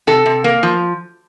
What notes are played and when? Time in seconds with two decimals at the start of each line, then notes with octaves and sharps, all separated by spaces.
0.07 C3 A4
0.26 C3
0.44 A#3
0.63 F3